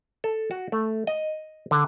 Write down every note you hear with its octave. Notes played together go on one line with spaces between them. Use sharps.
A4
F#4
A3
D#5
D3